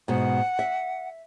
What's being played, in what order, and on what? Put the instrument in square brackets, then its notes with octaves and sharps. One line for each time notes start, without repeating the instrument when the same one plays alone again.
[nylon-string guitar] G#2 B2 [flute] F#5
[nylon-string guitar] E5